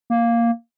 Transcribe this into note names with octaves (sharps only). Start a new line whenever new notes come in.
A#3